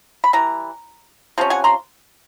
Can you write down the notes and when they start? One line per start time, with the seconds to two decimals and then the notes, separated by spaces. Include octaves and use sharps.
0.24 B5
0.33 E3 G3 A#5
1.38 C3 F3 C#4
1.50 F#5 G#5
1.64 A#5 C6